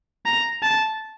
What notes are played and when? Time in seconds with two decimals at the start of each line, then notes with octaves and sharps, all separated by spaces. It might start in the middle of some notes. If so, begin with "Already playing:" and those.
0.26 A#5
0.63 A5